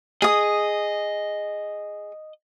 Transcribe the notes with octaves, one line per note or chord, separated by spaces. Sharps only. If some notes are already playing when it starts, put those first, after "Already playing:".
G#4 D#5 D#6